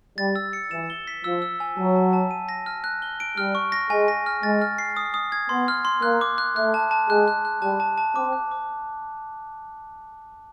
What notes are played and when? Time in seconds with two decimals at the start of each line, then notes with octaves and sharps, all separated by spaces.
0.18 G3 A6
0.36 E6
0.53 C#7
0.71 E3 E7
0.90 G7
1.07 B6
1.24 F3 E6
1.42 E6
1.60 G#5
1.77 F#3 A5
1.96 A5
2.13 A5
2.31 D#7
2.49 A#6
2.66 F6
2.84 F#6
3.02 G7
3.20 D7
3.37 G3 F6
3.55 C#6
3.72 A#6
3.90 G#3 G#5
4.08 A#6
4.26 F6
4.43 G#3 A6
4.62 F6
4.78 C7
4.97 D#6
5.14 D#6
5.32 G#6
5.49 B3 C6
5.68 F6
5.85 C6
6.02 A#3 F#6
6.21 D6
6.38 F#6
6.56 A3 F#6
6.74 A5
6.91 A5
7.10 G#3 F#6
7.28 F#6
7.45 F#6
7.62 G3 A5
7.80 A5
7.98 A5
8.16 C4 D6
8.33 F#6
8.52 D6